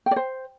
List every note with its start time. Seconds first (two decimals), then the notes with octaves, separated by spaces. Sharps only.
0.06 G5
0.11 D5
0.16 C5